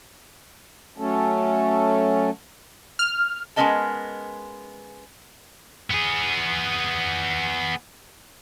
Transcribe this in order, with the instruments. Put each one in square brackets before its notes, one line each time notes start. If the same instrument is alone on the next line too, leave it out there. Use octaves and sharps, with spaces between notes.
[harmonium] F#3 A3 C#4 A4
[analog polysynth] F6
[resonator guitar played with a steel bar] G#3 B3 C#4 A#4 D#5 A5
[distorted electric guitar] B3 G#4